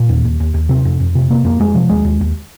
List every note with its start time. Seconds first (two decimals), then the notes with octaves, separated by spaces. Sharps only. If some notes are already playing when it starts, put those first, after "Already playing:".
Already playing: A#2
0.09 D#2
0.25 D#2
0.40 D#2
0.54 D#2
0.69 C3 C4
0.85 F2
1.00 F2
1.15 C3
1.30 C3 A#3
1.45 F2 A#3
1.60 F2 G#3
1.74 C3 F3
1.89 D#2 G#3
2.05 D#2
2.21 D#2